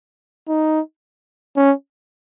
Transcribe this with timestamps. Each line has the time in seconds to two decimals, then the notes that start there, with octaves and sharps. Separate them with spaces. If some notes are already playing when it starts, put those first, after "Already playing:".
0.48 D#4
1.56 C#4